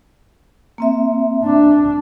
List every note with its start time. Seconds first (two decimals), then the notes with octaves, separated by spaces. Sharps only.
0.78 A#3 C4 E5
1.44 D4